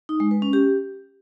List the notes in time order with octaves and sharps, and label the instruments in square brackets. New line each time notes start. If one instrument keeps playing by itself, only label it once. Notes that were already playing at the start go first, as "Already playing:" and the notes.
[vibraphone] D#4
G#3
B4
C#4
G4